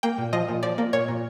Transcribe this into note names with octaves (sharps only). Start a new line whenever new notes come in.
A#3 G5
A#2
F3 D#5
A#2
F3 D5
A#3
A#2 C#5
A#2